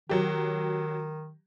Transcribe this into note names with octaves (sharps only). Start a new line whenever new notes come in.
D#3 F#3 G4